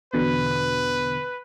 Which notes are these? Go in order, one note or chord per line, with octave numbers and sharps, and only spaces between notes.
E2 B2 D3 B4